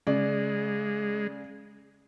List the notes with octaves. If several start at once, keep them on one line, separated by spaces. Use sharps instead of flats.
C#3 G#3 D5